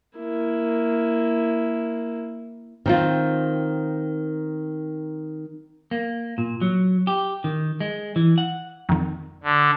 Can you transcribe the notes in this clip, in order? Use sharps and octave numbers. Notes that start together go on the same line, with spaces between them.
A#3 E4
D#3 C4 F4
A#3
A#2
F#3
G4
D#3
G#3
E3
F#5
F2 D#3
D3